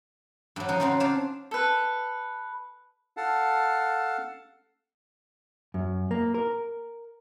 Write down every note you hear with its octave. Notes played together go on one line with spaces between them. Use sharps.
G2 F#3
C#3 F3 D#4
C#3 F#3 C4 C#4 F4
D4 C5 C#5 F5 A5
A4 B4
A4 F5 F#5 A5
F#2
A#3
A#4